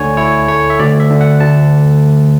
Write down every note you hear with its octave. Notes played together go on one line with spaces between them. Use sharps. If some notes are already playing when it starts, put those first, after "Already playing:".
Already playing: D2 D3 C#5 G#5
E4 C#5
A3 C#5
E5
D2 D5
E5
D3
F#5
D2 A5